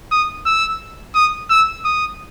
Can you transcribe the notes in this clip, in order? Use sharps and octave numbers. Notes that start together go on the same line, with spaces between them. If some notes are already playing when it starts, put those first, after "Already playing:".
D#6
E6
D#6
E6
D#6